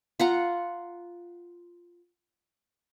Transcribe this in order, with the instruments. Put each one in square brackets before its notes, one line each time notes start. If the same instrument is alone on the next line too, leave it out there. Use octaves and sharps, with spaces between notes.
[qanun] F4 F#5 A#5